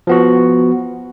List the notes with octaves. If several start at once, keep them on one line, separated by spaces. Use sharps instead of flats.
F3 B3 F#4